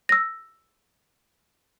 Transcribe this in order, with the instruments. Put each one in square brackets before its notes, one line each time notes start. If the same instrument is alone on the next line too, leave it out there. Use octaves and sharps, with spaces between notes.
[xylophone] E6 A#6